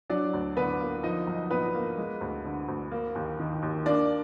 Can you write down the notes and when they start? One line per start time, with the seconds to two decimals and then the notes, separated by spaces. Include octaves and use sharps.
0.10 F#3 D4 D5
0.33 D2
0.56 D3 B3 B4
0.80 A#3
1.03 F3 D#4 D#5
1.27 B1
1.50 A#2 B3 B4
1.75 A#3
1.97 G#3
2.21 D2
2.44 D3
2.68 D2
2.91 A#3
3.15 D#2
3.39 D#3
3.62 D#2
3.86 A#3 D4 D5